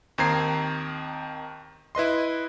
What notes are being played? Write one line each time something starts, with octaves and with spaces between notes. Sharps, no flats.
D#2 D#3 C4 A#5 G#6 C7
E4 B4 D#5 C6